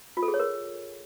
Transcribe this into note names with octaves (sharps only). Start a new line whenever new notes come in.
F4
A4
G#4
C#5
A#4